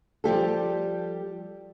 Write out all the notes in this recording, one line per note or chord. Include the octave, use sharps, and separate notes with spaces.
F3 G3 G4 A4